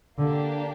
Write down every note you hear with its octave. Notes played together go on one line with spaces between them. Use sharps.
D3 A#3 D4 G4